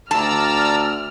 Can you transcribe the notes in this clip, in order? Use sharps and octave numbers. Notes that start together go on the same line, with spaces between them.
D2 D5 A5 A#5 E6 F6